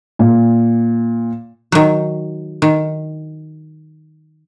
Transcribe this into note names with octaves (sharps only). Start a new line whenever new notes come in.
A#2
D#3 F#3
D#3